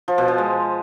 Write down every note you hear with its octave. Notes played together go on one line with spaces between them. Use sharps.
F3
B2
F3
G#3